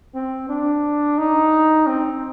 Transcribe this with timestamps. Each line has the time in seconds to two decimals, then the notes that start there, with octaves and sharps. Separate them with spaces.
0.15 C4
0.49 D4
1.18 D#4
1.87 C4